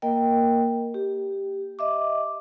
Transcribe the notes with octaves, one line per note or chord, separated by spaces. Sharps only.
A#3 A#4 D#5 G5
G4
D#5 E5 D6